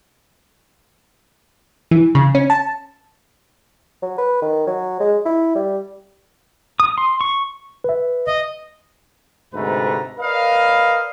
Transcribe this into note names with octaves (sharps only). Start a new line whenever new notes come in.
E3
C#3
C#4
A5
F#3
B4
D#3
F#3
G#3
E4
G3
D#6
C6
C#6
B4 E5
D#5
D2 G#2 C3 A3 B4 A#5
A#4 B4 D5 D#5 F5